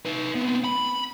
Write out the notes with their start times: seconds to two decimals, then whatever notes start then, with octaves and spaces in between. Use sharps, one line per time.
0.05 D#4 B4
0.35 B3 C4
0.64 B5